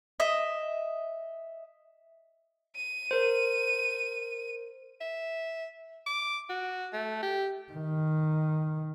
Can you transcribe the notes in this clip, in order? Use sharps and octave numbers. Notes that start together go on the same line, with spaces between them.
D#5 E5
D#7
A#4 C5
E5
D6
F#4
A3
G4
D#3